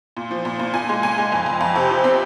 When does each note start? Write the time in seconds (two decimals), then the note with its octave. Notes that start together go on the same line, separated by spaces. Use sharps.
0.17 A#2
0.31 F3
0.45 A#2
0.59 A#2
0.74 A#2 G#5
0.89 G#3
1.03 A#2 G#5
1.18 G#3
1.32 F2
1.46 F2
1.61 F2
1.75 C3
1.90 F3
2.04 C4